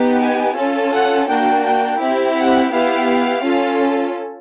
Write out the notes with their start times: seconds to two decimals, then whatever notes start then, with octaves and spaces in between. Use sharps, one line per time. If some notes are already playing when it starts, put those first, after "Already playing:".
Already playing: B3 D#4 G4
0.20 G#5
0.56 C#4 F4 A4
0.92 F#5
1.28 A#3 D4 F#4 G5
1.63 G5
1.99 C4 E4 G4
2.35 F#5
2.71 B3 E4 G4 F5
3.43 C#4 F4 A4